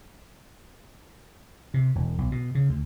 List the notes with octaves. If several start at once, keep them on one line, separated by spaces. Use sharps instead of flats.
C3
E1
B1
B2
C#3
D2